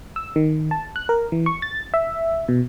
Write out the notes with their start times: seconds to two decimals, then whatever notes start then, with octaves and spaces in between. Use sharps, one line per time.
0.16 E6
0.36 D#3
0.71 A5
0.96 F#6
1.09 A#4
1.32 E3
1.46 C#6
1.62 A6
1.94 E5
2.48 B2